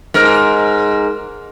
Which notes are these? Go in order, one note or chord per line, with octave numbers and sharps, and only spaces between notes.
G#2 A#4